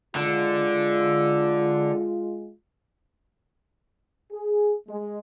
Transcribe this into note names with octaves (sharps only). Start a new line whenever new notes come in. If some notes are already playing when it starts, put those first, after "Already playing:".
D3 G#3 F4
G#4
G#3